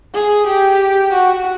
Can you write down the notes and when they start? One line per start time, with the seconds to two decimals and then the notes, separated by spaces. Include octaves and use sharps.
0.14 G#4
0.47 G4
1.13 F#4